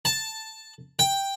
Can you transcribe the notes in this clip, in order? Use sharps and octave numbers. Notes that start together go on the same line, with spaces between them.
A5
G5